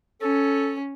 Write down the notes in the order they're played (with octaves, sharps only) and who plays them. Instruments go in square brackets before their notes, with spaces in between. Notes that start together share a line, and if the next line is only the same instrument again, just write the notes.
[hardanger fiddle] C#4 [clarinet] A4